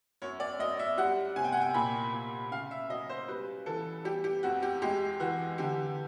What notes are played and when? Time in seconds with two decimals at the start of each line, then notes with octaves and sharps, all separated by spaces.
0.22 F#2 C#5
0.40 D5
0.59 F#2 D#5
0.79 E5
0.97 G3 F#5
1.36 C3 G#5
1.44 G5
1.52 F#5
1.61 G5
1.74 A#2 B5
2.13 A#2
2.51 C#3 F5
2.71 E5
2.90 F#3 D#5
3.09 C5
3.28 G3 B4
3.66 E3 A4
4.05 G3 G4
4.24 G4
4.43 F2 F#4
4.63 G4
4.82 G#3 G4
5.20 E3 F#4
5.58 D3 G4